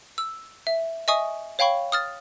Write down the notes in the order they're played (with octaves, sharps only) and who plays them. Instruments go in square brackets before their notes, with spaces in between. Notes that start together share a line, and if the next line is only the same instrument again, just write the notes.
[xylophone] E6
E5
D#5 E5 G#5 C#6 D#6
C#5 F5 G5 B5 C#6
D#6 F6 A6